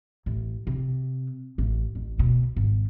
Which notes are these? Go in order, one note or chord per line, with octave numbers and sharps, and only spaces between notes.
A1
C3
A1
A1
D2 B2
G#1